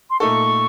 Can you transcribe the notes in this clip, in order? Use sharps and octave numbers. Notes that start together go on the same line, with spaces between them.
C6
A#2 A3 D#4 A4 C#6